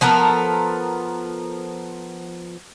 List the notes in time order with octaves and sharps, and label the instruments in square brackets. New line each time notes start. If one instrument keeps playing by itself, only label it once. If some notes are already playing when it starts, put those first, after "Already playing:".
[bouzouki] F3 B3 A4 A#4